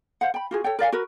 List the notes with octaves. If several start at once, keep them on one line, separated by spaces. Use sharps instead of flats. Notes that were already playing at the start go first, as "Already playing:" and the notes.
C5 F5 F#5
G5 B5
F4 F#4 G#4
A4 C#5 G5
A#4 D5 F5 G#5
F#4 A#4 B4